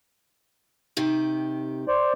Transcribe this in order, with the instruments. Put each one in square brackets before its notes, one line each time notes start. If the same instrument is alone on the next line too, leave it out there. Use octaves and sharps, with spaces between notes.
[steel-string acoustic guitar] C3 D#3 G4
[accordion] C5 D5